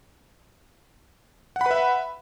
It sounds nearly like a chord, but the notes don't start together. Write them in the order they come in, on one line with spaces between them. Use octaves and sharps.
F#5 B5 B4 E5